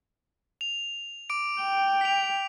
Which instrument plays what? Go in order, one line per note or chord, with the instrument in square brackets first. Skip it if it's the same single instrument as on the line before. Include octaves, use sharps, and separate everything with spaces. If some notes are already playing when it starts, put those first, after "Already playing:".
[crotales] F7
D6 D7
[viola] G5
[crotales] B6 F7